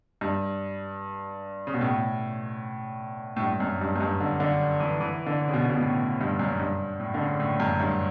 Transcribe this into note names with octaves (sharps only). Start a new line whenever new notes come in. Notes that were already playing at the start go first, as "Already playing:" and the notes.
G2
C#3
B2
A2
A2
G2
F#2
G2
F#2
G2
D3
D3
E3
E3
D3
C#3
B2
B2
A2
G2
F#2
G2
A2
D3
C#3
A2
F#2
G2